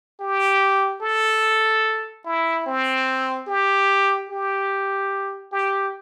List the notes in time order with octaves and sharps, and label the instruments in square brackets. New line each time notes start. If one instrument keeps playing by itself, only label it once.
[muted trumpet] G4
A4
E4
C4
G4
G4
G4